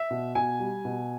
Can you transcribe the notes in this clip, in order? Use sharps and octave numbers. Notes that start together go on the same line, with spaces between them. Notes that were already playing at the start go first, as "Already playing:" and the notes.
Already playing: E5
B2
B2 G#5
G3
B2